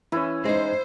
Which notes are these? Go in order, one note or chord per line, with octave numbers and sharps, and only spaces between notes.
E3 C#4 E4
G#3 D#4 C5